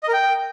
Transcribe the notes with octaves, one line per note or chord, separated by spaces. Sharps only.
D#5
A#4
G5